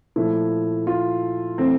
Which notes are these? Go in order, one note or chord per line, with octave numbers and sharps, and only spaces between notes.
A#2 F3 A3 E4
F4
E3 A3 C4